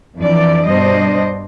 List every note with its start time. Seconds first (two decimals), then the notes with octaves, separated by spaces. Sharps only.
0.17 F2 E3 D4 D5
0.66 G2 B2 G3 D4 C5 D#5